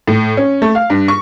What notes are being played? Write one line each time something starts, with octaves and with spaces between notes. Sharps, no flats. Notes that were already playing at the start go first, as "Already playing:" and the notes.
A2
C#4
A3
F5
G2
C#6